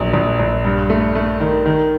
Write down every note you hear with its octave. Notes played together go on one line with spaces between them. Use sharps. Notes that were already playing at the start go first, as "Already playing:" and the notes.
Already playing: A#1 F#3
A#1
A#1
G2
A3
A3
D#3
D#3